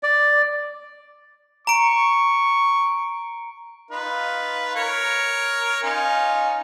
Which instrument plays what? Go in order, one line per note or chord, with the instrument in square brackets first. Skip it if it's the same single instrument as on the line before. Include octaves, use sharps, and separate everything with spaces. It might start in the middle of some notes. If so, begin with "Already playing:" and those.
[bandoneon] D5
[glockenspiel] A#5 D7 [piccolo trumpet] C#6
[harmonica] D#4 F4 B4
A#4 C#5
C#4 D#4 F4